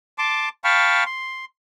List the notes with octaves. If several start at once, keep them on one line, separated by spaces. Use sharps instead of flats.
A5 C6 D6
F5 G5 A5 B5 C#6 F6
C6